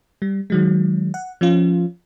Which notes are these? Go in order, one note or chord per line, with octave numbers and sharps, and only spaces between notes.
G3
D#3 F#3 G#3
F#5
F3 C#4 F4